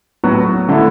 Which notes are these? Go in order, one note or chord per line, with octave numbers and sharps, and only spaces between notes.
A2 F#3 B3 F#4
D3 A3 E4